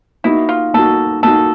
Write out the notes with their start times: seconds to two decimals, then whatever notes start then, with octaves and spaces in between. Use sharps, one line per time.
0.24 A#3 D#4 E4 F#4
0.49 F4
0.74 A#3 D#4 F#4 A4
1.23 A#3 D#4 F#4 A4